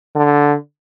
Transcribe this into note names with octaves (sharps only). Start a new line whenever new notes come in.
D3